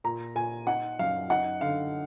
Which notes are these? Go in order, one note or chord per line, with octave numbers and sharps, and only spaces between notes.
A#2 A#5
A#2 G#5
D#4 F#5
F#2 F5
D#4 F#5
D3 F5